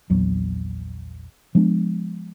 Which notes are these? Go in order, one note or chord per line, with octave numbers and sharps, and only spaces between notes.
A#1 E2 F#3
F3 G#3 B3 D4